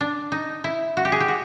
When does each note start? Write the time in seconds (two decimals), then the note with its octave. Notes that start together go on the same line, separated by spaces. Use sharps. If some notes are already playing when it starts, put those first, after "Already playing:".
0.01 D4
0.32 D#4
0.64 E4
0.97 F#4
1.05 G4
1.12 G#4
1.20 G4
1.28 F#4